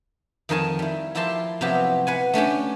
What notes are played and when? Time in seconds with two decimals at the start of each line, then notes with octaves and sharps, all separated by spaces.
0.49 F2 D#3 F3 A#4 G#5 A5
0.79 G3 E4
1.15 F3 E4 G4 A#4 A5 C6
1.61 C3 F3 F#3 B3 E4 G4
2.07 B4 F#5 G#5
2.33 A3 C#4 D4 G4